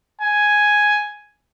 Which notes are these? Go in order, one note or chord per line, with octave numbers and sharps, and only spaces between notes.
G#5